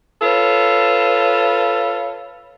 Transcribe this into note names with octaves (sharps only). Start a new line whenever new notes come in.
F4 A4 B4 C#5